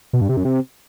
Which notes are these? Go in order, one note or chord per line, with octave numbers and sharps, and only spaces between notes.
B2
G2
C3
F#2
C3